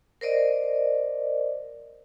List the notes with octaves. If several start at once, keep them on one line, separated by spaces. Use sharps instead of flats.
A#4 C5 D5 D#5